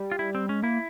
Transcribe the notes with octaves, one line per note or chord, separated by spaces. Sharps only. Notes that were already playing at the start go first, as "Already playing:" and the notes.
Already playing: G3
F4
E4
C4
G#3 C#4
A#3 E4